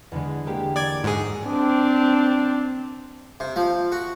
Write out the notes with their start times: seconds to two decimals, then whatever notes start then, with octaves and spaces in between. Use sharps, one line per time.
0.12 E2 D3 G#3
0.46 G#3 A#3 G4
0.76 D5 D6 G#6
1.04 G#2 F#4 G#4
1.45 C4 D4
3.40 C3
3.56 F3
3.92 F#4